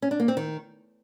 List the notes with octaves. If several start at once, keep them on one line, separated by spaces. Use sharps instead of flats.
C#4
D4
A#3
C4
D#3